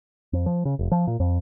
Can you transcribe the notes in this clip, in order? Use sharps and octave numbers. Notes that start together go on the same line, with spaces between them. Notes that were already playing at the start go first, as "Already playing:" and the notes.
F2
F3
C#3
F1
F3
A#2
F2